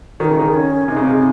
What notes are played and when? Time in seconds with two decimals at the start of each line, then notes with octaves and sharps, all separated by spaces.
0.20 D#3 F#4
0.24 D#4
0.30 C#3
0.39 D#3
0.54 C#4
0.88 C3 D#4
0.96 C#3
1.05 C3